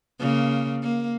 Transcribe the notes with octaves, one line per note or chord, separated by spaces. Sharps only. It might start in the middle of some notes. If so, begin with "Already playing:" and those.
C#3 A#3
A#3